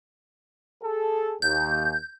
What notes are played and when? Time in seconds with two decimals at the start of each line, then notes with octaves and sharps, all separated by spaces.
0.81 G#4 A4
1.42 D#2 G6